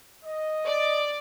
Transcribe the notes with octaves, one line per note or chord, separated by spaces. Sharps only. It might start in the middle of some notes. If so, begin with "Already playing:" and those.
D#5
D5